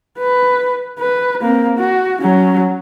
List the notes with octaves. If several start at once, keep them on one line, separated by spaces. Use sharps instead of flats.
B4
B4
A#3 C4
F#4
F#3 C#4